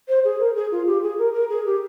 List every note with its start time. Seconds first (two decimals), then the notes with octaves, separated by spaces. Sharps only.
0.08 C5
0.25 G#4
0.40 A#4
0.55 G#4
0.72 F4
0.87 G4
1.02 G#4
1.19 A#4
1.34 A#4
1.50 G#4
1.65 G4